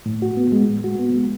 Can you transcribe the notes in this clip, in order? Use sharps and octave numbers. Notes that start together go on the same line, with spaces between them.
A2
F#4
B3
G#3
A2
F#4
B3
G#3